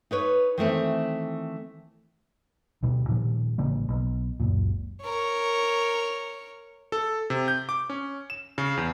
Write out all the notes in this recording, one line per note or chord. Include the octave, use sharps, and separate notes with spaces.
D#4 B4 C#5
D#3 E3 A3 C4
D2 B2 G3
A#2 D#3 F3 G3
A1 C#3 G3 A#3
B1
F#1 C#2 F#2 A#2
A#4 C#5
A4
C3
G6
D6
C#4
E7
C#3
E2